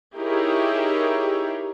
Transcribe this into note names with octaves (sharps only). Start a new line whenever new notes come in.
D#4 E4 G4 G#4 A#4 C#5